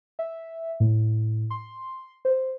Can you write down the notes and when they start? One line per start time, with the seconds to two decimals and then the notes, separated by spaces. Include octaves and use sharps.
0.19 E5
0.80 A2
1.50 C6
2.25 C5